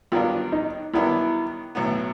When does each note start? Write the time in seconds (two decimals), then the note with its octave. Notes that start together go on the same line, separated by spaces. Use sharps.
0.12 G2 D#3 F#3 B3 D4 F4
0.52 D#4
0.93 G2 D#3 F#3 B3 D4 E4
1.75 B1 A2 F#3 B3